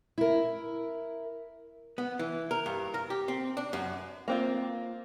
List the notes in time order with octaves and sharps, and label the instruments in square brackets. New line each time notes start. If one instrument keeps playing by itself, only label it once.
[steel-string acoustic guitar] E4 A#4
[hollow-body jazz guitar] B3
E3
A#4
G2
A#4
G4
C4
D4
F#2
[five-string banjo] A#3 C4 F4